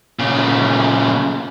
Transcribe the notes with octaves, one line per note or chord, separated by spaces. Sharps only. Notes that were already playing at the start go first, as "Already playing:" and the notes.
A#2 C#3